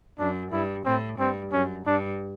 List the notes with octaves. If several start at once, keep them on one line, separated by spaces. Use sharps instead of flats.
F#2 D4
G2 E4
A2 C4
G2 C4
F#2 C#4
G2 D4